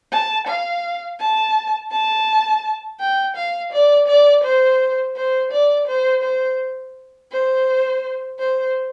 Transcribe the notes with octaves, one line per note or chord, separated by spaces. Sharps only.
A5
F5
A5
A5
G5
F5
D5
D5
C5
C5
D5
C5
C5
C5
C5